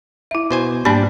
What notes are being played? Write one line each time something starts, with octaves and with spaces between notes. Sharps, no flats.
E4 E5
B2 C5 G#5
G#2 G3 A#3 D4 B5